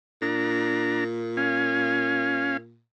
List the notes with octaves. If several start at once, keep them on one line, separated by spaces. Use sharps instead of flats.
A#2 D4 A#5
C#4 F5 G#5